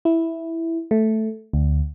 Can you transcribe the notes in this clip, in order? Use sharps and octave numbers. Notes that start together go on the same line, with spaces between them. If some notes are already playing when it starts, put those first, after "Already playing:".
E4
A3
D2